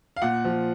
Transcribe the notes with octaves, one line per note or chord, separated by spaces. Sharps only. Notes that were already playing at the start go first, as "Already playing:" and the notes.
F5
A#2 F#5
F3